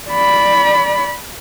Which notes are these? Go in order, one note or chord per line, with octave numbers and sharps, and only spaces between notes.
D5 B5